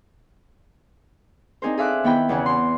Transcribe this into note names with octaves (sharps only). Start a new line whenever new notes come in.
C4 D4 D#4 G#4 A#4 C5
G#4 A4 E5 F5 D6 F#6
D#3 B3 E4 G5 B5 G6
E2 C#3 F#5
C6